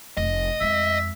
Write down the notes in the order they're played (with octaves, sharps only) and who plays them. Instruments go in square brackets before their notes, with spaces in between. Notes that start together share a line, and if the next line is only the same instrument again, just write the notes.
[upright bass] F1 [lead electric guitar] D#5
[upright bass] F2 G#3 [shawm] E5